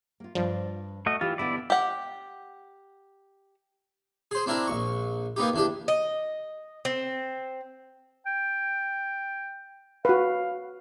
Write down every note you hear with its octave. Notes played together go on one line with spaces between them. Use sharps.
A#3 F4
G2 F3 D5
A3 F#4 D#5
E3 F4 G4
B2 D3 B3 E4 D5
G4 F#5
G#4 C5
C4 D4 E4 A#4
A#1 C#6
A#3 B3 D#4 G4
E2 D4 G4
D#5
C4
G5
F#4 B4 F5